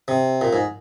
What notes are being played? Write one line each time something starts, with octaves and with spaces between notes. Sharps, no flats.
C3
A#2
G#2